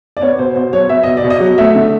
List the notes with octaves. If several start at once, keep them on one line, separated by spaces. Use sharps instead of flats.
D5
B3 C#5
B2 C5
B2 C5
F#3 C#5
B3 E5
B2 D#5
D5
B2
D#5
F#3
A3 E5
D3